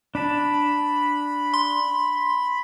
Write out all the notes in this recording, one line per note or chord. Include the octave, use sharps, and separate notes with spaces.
D4 A5 B5
C6